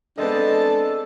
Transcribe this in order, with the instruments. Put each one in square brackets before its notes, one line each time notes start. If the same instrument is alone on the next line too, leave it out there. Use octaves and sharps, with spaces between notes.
[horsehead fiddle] G#3 A5 [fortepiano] B3 C4 D#5 [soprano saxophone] D4 [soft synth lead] A4